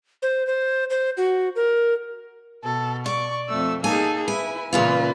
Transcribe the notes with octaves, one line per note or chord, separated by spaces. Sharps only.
C5
C5
C5
F#4
A#4
B2 A4
D5 C#6
F2 A3 E6
A#3 D#4 G#4 A4 G#5
E4 B4 G#5
A#2 C#3 E3 A#3 F4 B4